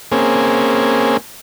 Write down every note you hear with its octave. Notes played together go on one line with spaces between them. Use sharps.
A#3 C4 C#4 G#4